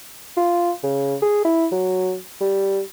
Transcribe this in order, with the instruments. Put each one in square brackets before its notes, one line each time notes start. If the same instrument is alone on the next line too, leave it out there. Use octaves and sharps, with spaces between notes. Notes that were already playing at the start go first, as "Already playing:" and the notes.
[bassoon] F4
C#3
G#4
E4
F#3
G3